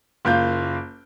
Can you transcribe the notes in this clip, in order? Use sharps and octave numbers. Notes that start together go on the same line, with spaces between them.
F#1 A#3 F4 G6